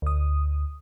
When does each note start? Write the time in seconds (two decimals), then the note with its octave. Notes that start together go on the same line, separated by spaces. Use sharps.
0.02 D2 D#6